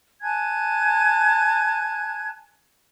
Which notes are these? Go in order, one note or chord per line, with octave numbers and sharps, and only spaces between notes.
G#5 A5 F#6 G#6